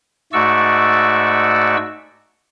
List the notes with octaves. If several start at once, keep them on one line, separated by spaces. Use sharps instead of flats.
G#2 A3 F#4 D5 C#6 E6